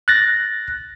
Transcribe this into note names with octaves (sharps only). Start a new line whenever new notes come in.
F#6 A6 A#6